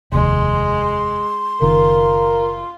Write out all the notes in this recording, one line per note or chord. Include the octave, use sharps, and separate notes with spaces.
F1 D#2 G#3 C6
F#1 D#3 F4 A#4